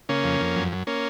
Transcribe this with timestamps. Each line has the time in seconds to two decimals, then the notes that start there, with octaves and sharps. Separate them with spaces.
0.09 C#3 A#3 C#4
0.24 F2
0.41 F2
0.56 F#2
0.72 F#2
0.87 A#3 C#4